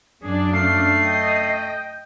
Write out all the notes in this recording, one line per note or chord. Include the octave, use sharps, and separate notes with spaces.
F#2 D4 G#4
A3 F5 C7
D#5 G5